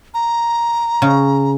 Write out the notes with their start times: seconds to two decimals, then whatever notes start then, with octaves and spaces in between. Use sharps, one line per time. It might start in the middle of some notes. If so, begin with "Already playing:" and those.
0.14 A#5
1.02 C#3